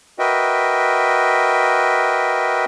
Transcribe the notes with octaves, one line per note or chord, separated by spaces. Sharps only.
F#4 A#4 B4 D#5 E5 G5